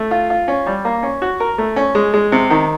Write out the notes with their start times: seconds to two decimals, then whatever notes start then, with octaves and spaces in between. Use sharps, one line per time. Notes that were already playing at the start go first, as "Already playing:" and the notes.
Already playing: A3
0.11 F4
0.30 F4
0.48 C#4
0.66 G3
0.85 A#3
1.03 C#4
1.22 F#4
1.40 A#4
1.58 A3
1.76 C#4
1.95 G#3
2.14 G#3
2.32 C3
2.50 D#3